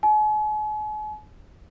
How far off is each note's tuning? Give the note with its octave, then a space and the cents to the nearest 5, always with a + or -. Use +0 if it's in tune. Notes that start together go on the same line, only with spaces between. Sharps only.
G#5 +45